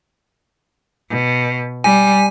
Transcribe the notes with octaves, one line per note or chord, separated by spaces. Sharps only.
B2
G3 G#5